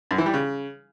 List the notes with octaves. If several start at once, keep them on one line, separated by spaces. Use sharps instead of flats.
F#2
E3
G3
C#3